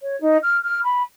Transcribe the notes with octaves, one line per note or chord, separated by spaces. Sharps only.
C#5
D#4
F6
F6
B5